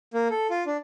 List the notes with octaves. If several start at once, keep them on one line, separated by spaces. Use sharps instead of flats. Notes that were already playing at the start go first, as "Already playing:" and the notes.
A#3
A4
F4
D4